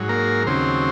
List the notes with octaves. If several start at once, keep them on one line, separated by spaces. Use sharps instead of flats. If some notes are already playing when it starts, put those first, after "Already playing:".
Already playing: G#2 F#3
A#3 A#4
D#2 C#3 F#3 C4 C5